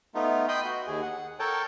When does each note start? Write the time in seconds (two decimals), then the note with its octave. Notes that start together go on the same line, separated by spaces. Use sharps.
0.15 A3 B3 D#4 F4
0.48 D#5 G5 B5 C6 D#6
0.64 F#4
0.87 D#2 G#4
1.02 F#5
1.39 A4 A#4 C#5 G5 A5